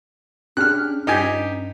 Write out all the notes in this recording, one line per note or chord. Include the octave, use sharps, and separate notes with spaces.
C#4 D4 G4 G#4 F6 F#6
G2 D#4 F4 G4 G#5 B6
C#4